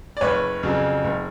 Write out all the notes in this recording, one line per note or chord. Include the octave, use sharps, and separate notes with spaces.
D5
F#1 B4 C#5
F2 C#3 F#3
F#1